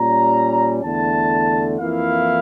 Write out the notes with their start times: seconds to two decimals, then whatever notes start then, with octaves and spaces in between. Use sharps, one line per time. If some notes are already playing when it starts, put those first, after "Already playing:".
Already playing: A#2 G3 C#4 A#5
0.83 E2 D3 A3 A5
1.79 F2 E3 A#3 E4 F5